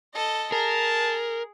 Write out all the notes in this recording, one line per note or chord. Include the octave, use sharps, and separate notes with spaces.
A4 D#5
G#4 A#4 A5